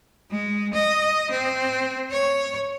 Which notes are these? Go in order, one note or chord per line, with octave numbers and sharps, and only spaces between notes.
G#3
D#5
C4
C#5